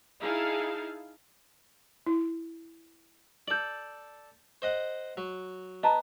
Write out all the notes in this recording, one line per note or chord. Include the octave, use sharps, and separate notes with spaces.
D#4 E4 G#4 F5 A5
E4
A4 D5 G6 F#7
C5 D#5 F#5
F#3
B3 D#5 A5 A#5